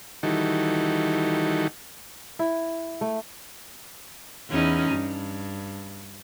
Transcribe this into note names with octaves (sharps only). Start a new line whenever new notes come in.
D#3 E3 G3 D#4 F#4 A4
E4
A3
E2 C#4 D#4
G2